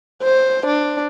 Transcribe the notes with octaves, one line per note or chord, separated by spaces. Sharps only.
C5
D4